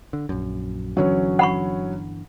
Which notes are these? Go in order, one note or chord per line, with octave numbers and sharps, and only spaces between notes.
D3
A#1 F#2
G1 D3 E3 F#3 C#4
F#5 B5 C#6